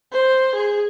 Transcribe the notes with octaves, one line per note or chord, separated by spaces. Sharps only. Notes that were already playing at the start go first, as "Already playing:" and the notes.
C5
G#4